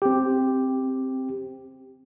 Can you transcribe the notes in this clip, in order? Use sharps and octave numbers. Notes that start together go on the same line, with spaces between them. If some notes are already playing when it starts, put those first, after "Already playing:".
C4 G4